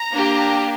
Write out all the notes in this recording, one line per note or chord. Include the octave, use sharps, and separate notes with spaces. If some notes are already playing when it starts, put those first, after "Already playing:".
Already playing: A#5
A#3 D4 G4